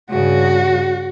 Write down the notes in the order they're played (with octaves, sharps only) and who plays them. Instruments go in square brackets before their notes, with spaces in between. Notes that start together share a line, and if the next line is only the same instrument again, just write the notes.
[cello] G2 C#3 [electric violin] F#4